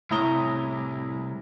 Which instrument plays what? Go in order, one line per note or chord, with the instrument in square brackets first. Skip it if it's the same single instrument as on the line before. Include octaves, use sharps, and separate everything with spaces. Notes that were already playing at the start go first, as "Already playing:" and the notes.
[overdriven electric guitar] C2 [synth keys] A2 A#5 [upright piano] E4 D#6 G7